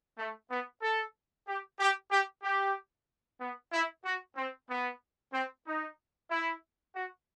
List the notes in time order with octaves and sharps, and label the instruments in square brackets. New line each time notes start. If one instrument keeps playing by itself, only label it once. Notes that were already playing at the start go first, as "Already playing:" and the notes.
[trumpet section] A3
B3
A4
G4
G4
G4
G4
B3
E4
F#4
C4
B3
C4
D#4
E4
F#4